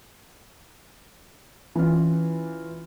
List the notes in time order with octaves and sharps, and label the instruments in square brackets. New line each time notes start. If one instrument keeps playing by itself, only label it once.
[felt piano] E3 C#4 F4